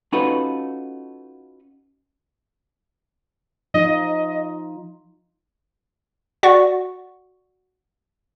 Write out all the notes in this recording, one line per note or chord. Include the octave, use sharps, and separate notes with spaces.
C#4 D#4 F4 F#4 A4 B4
F3 D#4 F4 D#5
F#4 D5 F#5 C#6